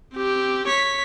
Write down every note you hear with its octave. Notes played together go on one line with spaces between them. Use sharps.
C4 G4
C#5 B6